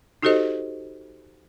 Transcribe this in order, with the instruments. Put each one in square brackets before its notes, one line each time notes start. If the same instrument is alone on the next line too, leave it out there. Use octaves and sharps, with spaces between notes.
[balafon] D#4 F#4 G4 A4 C5 D#5